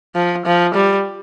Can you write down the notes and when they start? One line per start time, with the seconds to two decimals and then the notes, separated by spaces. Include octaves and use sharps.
0.15 F3
0.46 F3
0.74 G3